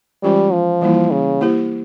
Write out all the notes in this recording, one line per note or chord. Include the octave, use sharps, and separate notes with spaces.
E3 G3 G#3 C#4 F4 C5
F3
E3 G3 A#3 E4
C#3
A#3 E4 G4 C5